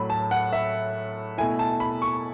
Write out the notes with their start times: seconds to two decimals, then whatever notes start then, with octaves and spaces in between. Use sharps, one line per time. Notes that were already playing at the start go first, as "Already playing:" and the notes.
Already playing: A2 F#3 A3 B5
0.10 A5
0.31 F#5
0.53 E5
1.38 B2 A3 E4 G#5
1.59 A5
1.80 B5
2.02 C#6